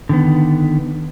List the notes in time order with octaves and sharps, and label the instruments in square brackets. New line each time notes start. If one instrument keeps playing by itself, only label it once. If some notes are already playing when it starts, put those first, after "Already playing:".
[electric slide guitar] D3 D#3 B3